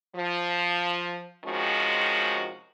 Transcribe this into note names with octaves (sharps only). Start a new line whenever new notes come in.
F3
C3 D#3 F3 G#3 C#4 F#4